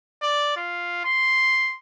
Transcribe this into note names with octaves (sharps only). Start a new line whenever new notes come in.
D5
F4
C6